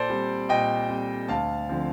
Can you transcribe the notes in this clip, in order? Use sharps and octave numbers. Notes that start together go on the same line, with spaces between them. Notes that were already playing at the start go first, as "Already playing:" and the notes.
Already playing: A#2 A4 C5 D5
G3 C4
A#2 D#5 G5
G3 C4
D2 F5 A5
D3 F3 C4